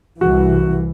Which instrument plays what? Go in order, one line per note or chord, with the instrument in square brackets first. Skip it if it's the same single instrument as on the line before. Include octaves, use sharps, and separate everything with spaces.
[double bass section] C2 E3 [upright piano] F#4